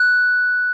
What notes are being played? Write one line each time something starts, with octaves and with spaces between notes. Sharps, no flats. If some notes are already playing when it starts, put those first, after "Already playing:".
Already playing: F#6